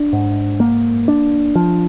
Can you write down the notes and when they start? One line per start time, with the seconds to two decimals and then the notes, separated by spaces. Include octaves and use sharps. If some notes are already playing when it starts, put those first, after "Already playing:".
Already playing: D4
0.13 G#2
0.60 A#3
1.08 D4
1.56 F3